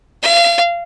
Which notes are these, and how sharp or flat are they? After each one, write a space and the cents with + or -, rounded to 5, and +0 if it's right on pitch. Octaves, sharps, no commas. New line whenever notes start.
F5 -35